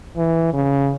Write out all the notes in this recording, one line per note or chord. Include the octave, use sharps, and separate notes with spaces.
E3
C#3